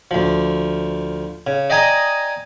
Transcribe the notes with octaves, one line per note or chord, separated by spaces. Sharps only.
D2 F3
C#3
D5 D#5 G5 G#5 A#5 D#6